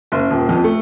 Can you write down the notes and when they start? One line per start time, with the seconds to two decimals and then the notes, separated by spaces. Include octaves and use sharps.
0.12 F#1
0.30 D#1
0.49 F2
0.64 A3